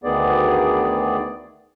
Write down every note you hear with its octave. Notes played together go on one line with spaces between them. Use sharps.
D2 D#3 B3 G#4 D5